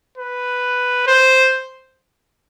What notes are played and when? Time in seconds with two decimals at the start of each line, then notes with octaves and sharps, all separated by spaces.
0.18 B4
1.07 C5